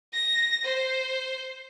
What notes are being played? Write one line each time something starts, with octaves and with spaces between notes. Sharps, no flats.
A#6
C5